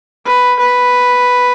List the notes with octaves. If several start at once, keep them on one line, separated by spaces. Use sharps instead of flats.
B4
B4